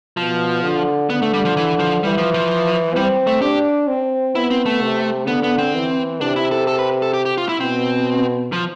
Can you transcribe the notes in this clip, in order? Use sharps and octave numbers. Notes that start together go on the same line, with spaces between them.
B2 F3
D3
D3 B3
A3
G3
F3
E3
F3
E3 G3
F3
F3
G3 C4
A3
D4 G4
C4
B3 E4
C4
A3
C3
D3 B3
B3
C4
E3
C3 D4
E4
A4
A4
B4
A4
G4
G4
F4
E4
B2 C4
F3